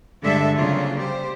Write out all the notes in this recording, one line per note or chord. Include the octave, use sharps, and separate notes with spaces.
G2 D3 G#3 D4 A4 E5
C#3 F#3 A#3 C4 D4 F4
G3 G4 C5